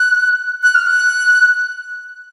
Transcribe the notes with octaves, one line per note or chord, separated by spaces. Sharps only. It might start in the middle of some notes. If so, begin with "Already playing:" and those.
Already playing: F#6
F#6
F6
F#6